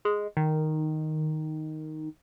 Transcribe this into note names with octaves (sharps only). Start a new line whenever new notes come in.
G#3
D#3